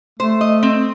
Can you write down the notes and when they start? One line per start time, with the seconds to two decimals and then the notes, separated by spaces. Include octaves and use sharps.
0.19 A3 C5
0.41 D#5
0.63 C4